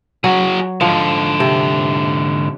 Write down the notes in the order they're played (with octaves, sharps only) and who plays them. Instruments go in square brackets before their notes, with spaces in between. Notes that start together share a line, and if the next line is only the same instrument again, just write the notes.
[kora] F#3 [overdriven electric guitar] F#4 G#4
[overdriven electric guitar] G#2 D3 [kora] F3
[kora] C3